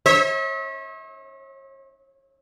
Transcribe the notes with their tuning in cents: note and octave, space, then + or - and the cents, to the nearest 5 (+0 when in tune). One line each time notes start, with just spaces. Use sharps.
C#5 -40 E5 -40